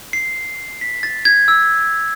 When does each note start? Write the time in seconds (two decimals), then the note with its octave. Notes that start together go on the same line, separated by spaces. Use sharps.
0.13 C7
0.81 B6
1.03 A6
1.25 G#6
1.48 E6